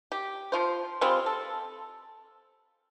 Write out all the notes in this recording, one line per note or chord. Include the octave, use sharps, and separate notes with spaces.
G4
F3 F4 C5
G3 G#3 C4 F4
A4